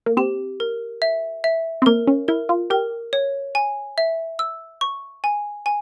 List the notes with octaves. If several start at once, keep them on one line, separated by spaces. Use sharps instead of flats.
A#3
C4 G4
A#4
E5
E5
C4
A#3 A#4
C#4
E4 A#4
F4
G4 A#4
C#5
G#5
E5
E6
C#6
G#5
G#5